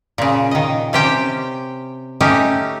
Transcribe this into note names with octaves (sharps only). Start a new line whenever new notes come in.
A#2 C#3
D#3 D#5
C3 C#4 G4 C5 G5
A3 C#4 D#4 G4